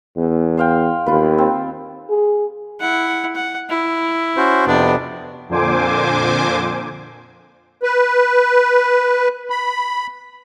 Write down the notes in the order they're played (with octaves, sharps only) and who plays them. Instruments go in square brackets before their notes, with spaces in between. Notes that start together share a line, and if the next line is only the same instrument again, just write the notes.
[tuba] E2
[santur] C5 F5 G5
[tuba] D#2 [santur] F4 B4
[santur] C4
[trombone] G#4
[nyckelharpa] E4 F#5
F#5
E4
[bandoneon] C#4 F#4 C5
[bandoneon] F2 C3 B3 [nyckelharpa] D4
[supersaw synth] F2 A#2 D3 C5 G#5 D6
[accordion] B4
B5